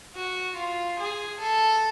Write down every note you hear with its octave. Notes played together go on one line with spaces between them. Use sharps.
F#4
F4
G#4
A4